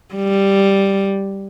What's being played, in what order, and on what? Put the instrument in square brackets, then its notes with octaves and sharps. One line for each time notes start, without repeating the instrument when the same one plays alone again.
[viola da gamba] G3